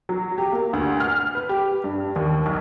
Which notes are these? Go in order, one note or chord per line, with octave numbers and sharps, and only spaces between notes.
F#3
G4
A#3
D2
F6
B4
G4
G2
D#2
B1